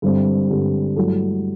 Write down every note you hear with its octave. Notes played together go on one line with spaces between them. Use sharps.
G2 D3 G3 C4
G2 D3 G3 C4
G2 F#3 A3 E4 A4